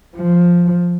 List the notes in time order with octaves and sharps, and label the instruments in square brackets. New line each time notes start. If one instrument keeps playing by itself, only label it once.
[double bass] F3